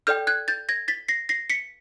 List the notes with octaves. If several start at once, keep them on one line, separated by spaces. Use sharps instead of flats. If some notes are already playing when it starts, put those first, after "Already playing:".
A4 D5 G5 F6 G6
F#6 G#6
G6 A6
G#6 A#6
A6 B6
A#6 C7
A#6 C7
B6 C#7